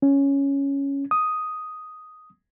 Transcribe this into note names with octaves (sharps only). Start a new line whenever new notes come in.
C#4
D#6